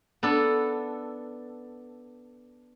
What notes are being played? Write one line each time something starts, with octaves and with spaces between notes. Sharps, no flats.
B3 D4 A4